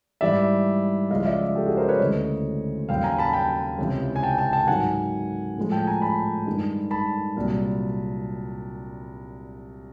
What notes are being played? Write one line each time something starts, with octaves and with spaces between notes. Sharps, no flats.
G#2 E3 G3 D5 E5
C#2 C#3 F3 G#3 D#5 F5
D5 E5
G4 A4
F#4 G#4
A#4 C5
B4 C#5
D2 C#3 E3 G#3 C#5 D#5
D#2 C#3 F#3 F5 G5
G#5 A#5
A5 B5
G5 A5
C#2 C3 E3
G#5
G5 A5
G5 A5
G5 A5
G#2 D#3 F#3 F#5 G#5
A2 F3 G#3
G5 A5
G#5 A#5
A5 B5
G2 D#3 G#3
A5 B5
C2 A#2 F#3